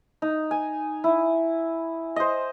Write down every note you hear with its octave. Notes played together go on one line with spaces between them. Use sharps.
D#4
G#5
E4
C5 D#5